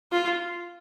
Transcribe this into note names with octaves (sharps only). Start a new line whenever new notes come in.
F4